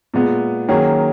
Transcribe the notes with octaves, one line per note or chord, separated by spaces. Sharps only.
A#2 G#3 B3
D#3 F#3 A#3 C#4 G#4